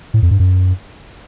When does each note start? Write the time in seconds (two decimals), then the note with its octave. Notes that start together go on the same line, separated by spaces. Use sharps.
0.14 A2
0.22 F2
0.31 G2
0.40 F#2